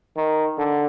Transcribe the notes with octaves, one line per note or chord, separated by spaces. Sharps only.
D#3
D3